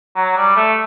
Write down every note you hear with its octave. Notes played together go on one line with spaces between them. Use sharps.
F#3
G3
A3